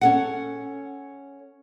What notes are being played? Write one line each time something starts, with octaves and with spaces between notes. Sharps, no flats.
C#4 A4 F#5